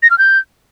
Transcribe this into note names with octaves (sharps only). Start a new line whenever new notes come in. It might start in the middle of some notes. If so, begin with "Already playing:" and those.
A#6
F6
G6